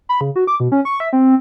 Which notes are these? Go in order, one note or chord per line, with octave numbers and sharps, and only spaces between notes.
B5
C#3
F#4
D6
B2
C#4
C#6
E5
C4